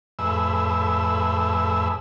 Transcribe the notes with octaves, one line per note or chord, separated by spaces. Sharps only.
F2 A2 G#4 B4 E5 E6